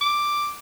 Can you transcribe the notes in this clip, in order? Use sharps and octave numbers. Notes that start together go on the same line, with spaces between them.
D6